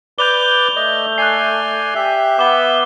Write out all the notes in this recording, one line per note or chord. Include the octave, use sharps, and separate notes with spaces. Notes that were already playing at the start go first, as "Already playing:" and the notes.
B4 D5 D6 G6 F7 G7
A3 D5 D#5
D5 G#5 F#6 C7
G4 E5
B3 D6 G7